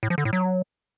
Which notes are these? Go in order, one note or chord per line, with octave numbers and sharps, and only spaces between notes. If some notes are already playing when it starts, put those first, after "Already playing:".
A2
F3
D3
A2
F#3